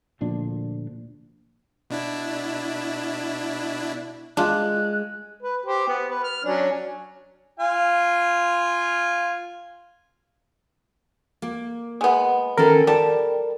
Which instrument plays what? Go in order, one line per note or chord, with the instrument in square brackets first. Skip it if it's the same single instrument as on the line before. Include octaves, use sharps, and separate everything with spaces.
[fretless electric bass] D2 A#2 F3 D4
[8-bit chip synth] B2 D4 E4
[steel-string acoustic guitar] G#3 [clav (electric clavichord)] D4 F4 [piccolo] F#6
[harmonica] B4
G4 C5
B3
B4
F6
F#3 C#4 D4
F4 F5 G#5
[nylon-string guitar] A#3
[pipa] G#3 B3
[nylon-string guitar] D#3 C#4 A4 [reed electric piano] A#4
[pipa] G3 [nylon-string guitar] A5